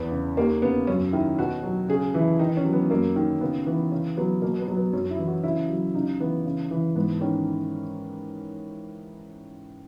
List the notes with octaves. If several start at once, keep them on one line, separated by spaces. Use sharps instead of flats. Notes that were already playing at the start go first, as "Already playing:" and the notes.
Already playing: E2 B3
C#3
D#2 A#3
C#3 B3
F#2 C#4
D#3 E4
B2 F#4
F#3
C#3 G#4
E3 E4
D#3 D#4
C#4
F#3
B3
F#2 A#3
D#3
C#3 B3
E3 B3
C#3 C#4
F#3 B3
B2 A#3
B3
F#3
B3
F#2 C#4
E4
E3
F#4
C#3 E4
F#3
C#3 D#4
E3 B3
C#3
E3
G#2 B3
D#3 C#4